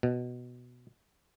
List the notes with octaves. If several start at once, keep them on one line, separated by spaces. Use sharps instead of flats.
B2